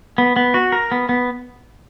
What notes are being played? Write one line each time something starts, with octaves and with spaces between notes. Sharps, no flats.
B3
B3
F#4
A#4
B3
B3